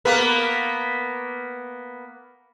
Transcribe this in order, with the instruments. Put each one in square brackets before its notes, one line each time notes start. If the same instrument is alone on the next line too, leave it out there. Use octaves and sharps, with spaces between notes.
[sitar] A#3 B3 B4